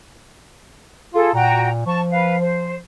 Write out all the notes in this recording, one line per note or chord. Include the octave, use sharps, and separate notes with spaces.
F4 G#4 A4
A#2 F#4 G5 A#5
F3 A5 C#6
B4 F5
C5